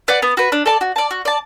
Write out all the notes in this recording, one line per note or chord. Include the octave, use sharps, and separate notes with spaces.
B4 D5 F#5
B3
F#4 B4
D4
A4 D5 A5
F#4
D5 A5
F#4
D5 A5